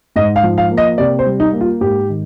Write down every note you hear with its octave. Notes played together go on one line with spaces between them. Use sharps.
G#2 D#5
F5
F3
F5
A#3
D#5
C3 D5
C5
G3
D#4
A#3
F4
G#2 G4
D#3